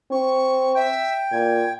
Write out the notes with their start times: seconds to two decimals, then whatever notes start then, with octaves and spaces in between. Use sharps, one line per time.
0.11 C4 C#6
0.75 E5 G5
1.32 A#2 G#6